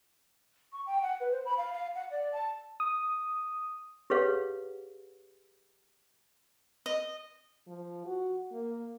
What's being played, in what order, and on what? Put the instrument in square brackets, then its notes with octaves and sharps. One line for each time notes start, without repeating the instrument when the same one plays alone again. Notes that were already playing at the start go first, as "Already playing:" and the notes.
[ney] C#6
G5
F#5
B4
C5
B5
F5
F5
F#5
D5
A5
[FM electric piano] D#6
[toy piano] G4 G#4 B4 C#5 F5 F#5
[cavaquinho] D#5
[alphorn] F3
F#4
A#3